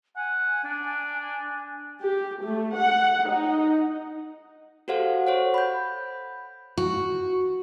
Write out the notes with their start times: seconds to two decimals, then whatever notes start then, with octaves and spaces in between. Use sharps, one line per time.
0.16 F#5 G#5
0.64 D4
2.02 G4
2.44 A3
2.76 F#5
3.30 D#4
4.88 F#4 G4 A4 C5 F5 F#5
5.27 C5 C#5 F#5
5.54 B5 G6
6.78 F#4